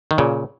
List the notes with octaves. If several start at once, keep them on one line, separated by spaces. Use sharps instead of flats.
D#3
A#2 C#3